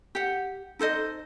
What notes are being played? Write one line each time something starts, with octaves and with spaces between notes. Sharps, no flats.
G4 F#5
D#4 A4 C5 D#5